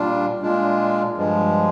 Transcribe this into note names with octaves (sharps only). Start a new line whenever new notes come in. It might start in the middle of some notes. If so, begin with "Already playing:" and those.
Already playing: A#2 G3 D4 F4
A#2 G#3 D4 F4
G2 F3 G#3